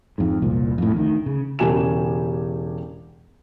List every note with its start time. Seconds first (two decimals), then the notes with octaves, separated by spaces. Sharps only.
0.18 F2 G#2
0.42 E1 C2 A#2
0.78 F2 A2
0.96 D2 D#3
1.26 C#3
1.59 E1 C#3 G4 G#5 A5 E7